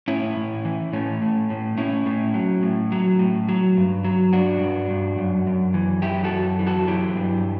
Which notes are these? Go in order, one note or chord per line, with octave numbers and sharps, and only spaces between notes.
A2 C#4 E4
A2
E3
A2 A3 C#4
A2
A2
A2 C#4 E4
A2
F#3
A2
F#3
A2
F#3
G2
F#3
G2 D4 F#4
G2
G2
F#2
F#2
E3
F#2 E4 G4
F#4 A4
F#2
E3
F#4 A4
F#3 E4 G4
G2